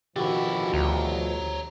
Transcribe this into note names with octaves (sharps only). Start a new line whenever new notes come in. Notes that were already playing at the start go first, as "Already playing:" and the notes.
B2 D3 D#3 F3 E4 F#4 G4
D2 C#5 A#5